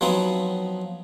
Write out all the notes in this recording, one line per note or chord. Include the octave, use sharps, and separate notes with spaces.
F3 F#3 B3 C4 D#4